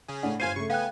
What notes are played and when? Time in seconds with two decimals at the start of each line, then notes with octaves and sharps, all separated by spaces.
0.08 C#3 C#4 G#4
0.23 A2 D4 F#5
0.40 G1 C5 F5 G#5 G#6 C7 D#7
0.56 C#3 A3 C#6
0.70 B3 F5 G5 G#5 F#6